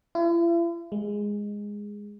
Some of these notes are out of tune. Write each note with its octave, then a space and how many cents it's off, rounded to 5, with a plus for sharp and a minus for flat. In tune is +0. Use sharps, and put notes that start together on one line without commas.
E4 +45
G#3 -10